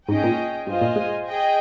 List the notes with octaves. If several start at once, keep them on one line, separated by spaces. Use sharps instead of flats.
G#2 C#4 G#4 D#5 G5
A#2
G2 F4 C5 D#5 G#5
A#2
G#3
G#4 D#5 G5